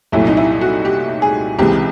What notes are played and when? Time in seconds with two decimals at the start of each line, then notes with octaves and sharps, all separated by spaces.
0.12 C2 A#2 F#3 A3 E4
0.27 D#4
0.37 E4
0.61 F#4
0.85 G4
1.22 G#4
1.59 C#2 C3 E3 G#3 G4